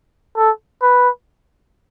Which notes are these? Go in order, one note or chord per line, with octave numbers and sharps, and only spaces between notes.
A4
B4